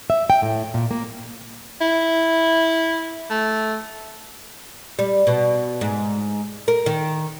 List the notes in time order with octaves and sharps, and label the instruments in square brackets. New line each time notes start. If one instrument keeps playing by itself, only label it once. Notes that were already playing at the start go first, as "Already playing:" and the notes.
[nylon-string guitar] E5
G5
A2
A#2
A#3
[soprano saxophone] E4
A3
[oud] G3
B2
G#2
A#4
D#3